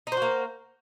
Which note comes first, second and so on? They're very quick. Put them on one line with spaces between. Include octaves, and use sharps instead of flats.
D#4 C5 F#4 A#3